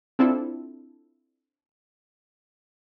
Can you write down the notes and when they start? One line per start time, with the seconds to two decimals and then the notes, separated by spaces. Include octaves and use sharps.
0.19 C4 D4 E4 F4 A4